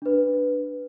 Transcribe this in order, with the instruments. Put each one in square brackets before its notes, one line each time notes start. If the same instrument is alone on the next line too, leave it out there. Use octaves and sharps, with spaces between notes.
[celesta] D4 B4